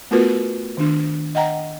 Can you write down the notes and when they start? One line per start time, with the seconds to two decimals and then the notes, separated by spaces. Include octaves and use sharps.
0.11 A3 B3 F4 F#4 A#4 B4
0.77 D#3 D4
1.35 D#5 F#5 G5 A#5